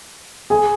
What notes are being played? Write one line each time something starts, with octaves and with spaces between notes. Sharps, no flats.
G#4 G#5